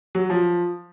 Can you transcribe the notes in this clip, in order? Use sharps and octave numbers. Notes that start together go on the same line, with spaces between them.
F#3
F3